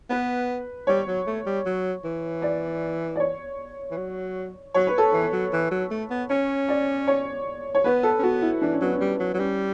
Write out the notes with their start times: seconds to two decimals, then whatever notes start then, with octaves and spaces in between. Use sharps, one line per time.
0.10 B3 B4
0.87 G3 C#5
1.07 F#3
1.27 A3
1.46 G3
1.66 F#3
2.04 E3
2.42 D5
3.16 D5
3.20 C#5
3.91 E3
3.97 F#3
4.74 F#3 C#5
4.87 B4
4.98 A4
5.10 E3 B4
5.32 F#3
5.52 E3
5.71 F#3
5.91 A3
6.10 B3
6.29 C#4 C#5
6.69 D5
7.07 C#5
7.75 C#5
7.84 B3 B4
8.03 A4
8.19 C#4
8.23 B3 F#4
8.42 E4
8.61 E3 D4
8.73 C#4
8.81 F#3 B3
8.93 C#4
9.01 G3
9.19 F#3
9.34 F#3
9.39 G3 C#4